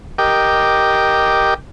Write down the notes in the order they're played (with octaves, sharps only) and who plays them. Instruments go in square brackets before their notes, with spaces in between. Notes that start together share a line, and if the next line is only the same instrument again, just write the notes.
[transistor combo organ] G4 A#4 D#5 G5 D6